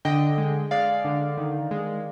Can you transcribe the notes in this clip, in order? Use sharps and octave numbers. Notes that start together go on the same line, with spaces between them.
D3 D#5 G5
G#3
G#3 D5 F5
D3
D#3
G#3